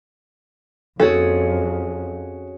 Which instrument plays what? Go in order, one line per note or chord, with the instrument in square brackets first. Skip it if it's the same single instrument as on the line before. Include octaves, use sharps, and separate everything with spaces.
[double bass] F2 [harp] C#4 F#4 G#4 [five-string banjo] A4